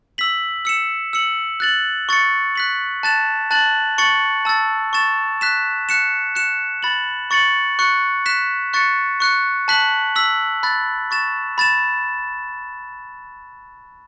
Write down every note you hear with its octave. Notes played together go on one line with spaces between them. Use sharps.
E6 B6 F#7
E6 C#7 E7
E6 C#7 F#7
F#6 A6 F#7
C#6 A6 C#7
F#6 B6 F#7
A5 F#6 A6 E7
A5 F#6 A6 F#7
C#6 A6 C#7 F#7
A5 E6 A6
C#6 A6 E7
F#6 B6 E7
F#6 C#7 E7
F#6 C#7 E7
B5 A6 F#7
C#6 A6 C#7 F#7
C#6 F#6 C#7
F#6 B6 E7
C#6 F#6 A6 C#7
C#6 F#6 C#7
A5 F#6 B6 F#7
E6 B6 F#7
B5 F#6 A6
C#6 A6 E7
B5 A6 E7